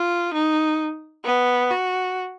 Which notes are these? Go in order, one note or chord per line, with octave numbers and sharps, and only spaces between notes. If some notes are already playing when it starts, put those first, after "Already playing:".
Already playing: F4
D#4
B3
F#4